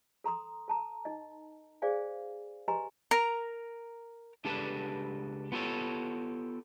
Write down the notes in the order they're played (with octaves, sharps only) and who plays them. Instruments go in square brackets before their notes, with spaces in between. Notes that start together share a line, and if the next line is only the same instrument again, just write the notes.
[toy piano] A4 A#5 C6 D#6
A4 A5 A#5
D#4 D#5
G#4 C5 D5 F5 G#5
G4 B4 D#5 G#5 A#5 C6
[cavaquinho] A#4 A#5
[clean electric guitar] C#2 D4 G4 A4 B4 A5
B3 F4 G4 A4 C#5